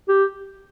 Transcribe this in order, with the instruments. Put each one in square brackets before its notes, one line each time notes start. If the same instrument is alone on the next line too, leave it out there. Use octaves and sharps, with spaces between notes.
[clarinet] G4